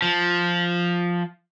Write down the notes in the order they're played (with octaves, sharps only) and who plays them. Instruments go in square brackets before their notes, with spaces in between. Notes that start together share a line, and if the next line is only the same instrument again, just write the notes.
[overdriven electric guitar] F3